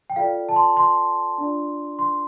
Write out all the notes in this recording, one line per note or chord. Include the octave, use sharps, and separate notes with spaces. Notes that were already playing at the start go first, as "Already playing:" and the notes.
G5
F4 A4 D5 F5
A5
C6
C6
D4 F4 D5
C6